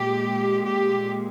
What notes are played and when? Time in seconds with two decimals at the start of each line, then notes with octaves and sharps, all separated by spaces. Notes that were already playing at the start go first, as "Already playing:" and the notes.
Already playing: A#2 G#3 G4
0.65 G4